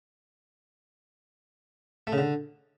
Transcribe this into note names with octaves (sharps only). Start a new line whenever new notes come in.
A3
C#3
D3